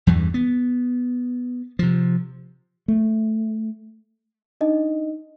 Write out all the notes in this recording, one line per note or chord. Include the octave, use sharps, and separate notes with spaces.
E2 G2 E3 G3
B3
C3 F3
A3
D4 D#4 D#5